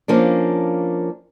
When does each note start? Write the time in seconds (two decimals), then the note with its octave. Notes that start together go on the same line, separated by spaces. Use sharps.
0.08 F3 A#3 C#4 D4